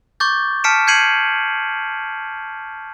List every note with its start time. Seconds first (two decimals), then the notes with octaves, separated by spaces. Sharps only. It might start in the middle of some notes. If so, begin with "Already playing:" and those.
0.20 C#6 D6 G6 A6
0.64 A5 F6 B6 C#7 D7 E7
0.87 G6 G#6 C7 C#7 D#7 F#7